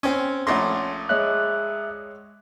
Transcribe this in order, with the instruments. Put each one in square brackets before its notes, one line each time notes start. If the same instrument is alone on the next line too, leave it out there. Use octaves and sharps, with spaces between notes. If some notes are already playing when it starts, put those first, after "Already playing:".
[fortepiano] C4 C#4
[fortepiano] A#1 A3 C6 [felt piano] C#4 F#5 A#6
[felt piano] G#3 C#5 D#5 [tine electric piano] E5 F#6